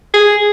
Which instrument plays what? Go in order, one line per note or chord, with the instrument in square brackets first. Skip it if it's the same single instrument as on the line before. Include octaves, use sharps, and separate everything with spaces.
[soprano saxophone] G#4